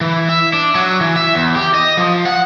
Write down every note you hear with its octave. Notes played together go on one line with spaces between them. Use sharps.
E3
E5
D4
F#3
E3
E5
E2
G4
D#5
F3
F#5